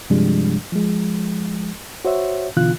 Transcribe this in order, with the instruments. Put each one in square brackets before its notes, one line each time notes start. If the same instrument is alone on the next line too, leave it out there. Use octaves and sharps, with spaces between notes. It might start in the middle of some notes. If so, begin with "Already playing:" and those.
[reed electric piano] G2 C3 F3 G3 G#3 D4
F3 G#3
F#4 C5 C#5 E5
B2 D3 E3 F4 F#6